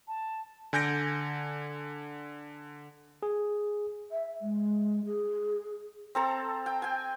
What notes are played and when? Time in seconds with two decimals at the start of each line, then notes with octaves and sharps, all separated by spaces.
0.08 A5
0.73 D3 G#5 G6 A#6 D7
3.23 G#4
4.12 E5
4.41 G#3
5.05 G#4
6.15 C4 A4 A#5
6.66 G5
6.82 G5 G#5